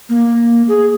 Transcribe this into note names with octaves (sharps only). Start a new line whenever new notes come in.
A#3
G#4